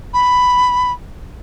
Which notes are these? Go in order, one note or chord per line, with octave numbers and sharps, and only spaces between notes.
B5